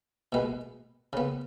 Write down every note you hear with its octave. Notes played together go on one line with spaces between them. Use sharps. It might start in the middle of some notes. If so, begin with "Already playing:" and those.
B2 G#3 B3
C#3 B3